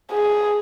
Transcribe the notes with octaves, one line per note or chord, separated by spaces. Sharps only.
G#4